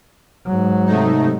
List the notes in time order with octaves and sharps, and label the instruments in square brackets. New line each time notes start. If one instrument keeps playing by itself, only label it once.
[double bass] G#2 F#3
[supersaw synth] C3 A3 D#4